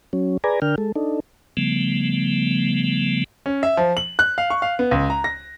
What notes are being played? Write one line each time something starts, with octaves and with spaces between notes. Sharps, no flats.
F#3 C#4
G#4 B4 D5 G#5 A#5
D3 D4 A#4 G5 F6
G#3 A4
D4 D#4 A4
C#3 F3 G3 A3 B3
C#4
E5
F3
F#7
F#6
F5
C#6
F5
B3
C#2
A#5
A#6